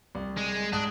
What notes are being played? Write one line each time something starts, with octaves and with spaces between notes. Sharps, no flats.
C2
G#3
G#2 D4 D#6 F#6